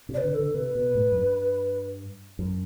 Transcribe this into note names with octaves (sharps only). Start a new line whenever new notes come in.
C3
D5
B4
D3
A4
D3
C3 B4
B2
A2
F#2
G2
F#2